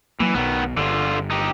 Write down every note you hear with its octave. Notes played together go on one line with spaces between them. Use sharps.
E3 F#3 A#3
B1 B2 D#3 B3
G1 D3 F4
D#4 G4